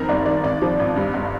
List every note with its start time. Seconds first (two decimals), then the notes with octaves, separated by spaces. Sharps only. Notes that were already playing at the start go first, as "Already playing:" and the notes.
Already playing: F2 D#3 A#4
0.09 G1 D5
0.26 D#3 D5
0.43 G#1 D5
0.62 F3
0.80 G#1
0.96 G2
1.14 G1